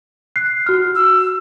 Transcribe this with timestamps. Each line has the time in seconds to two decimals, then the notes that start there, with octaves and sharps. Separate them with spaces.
0.36 F#6 C7
0.66 F#4 F6
0.95 E6